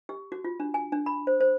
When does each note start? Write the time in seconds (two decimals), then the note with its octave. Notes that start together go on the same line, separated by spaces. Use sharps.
0.09 G4
0.32 F#4
0.44 F4
0.60 D4
0.74 G#5
0.92 D4
1.06 B5
1.27 C5
1.40 C5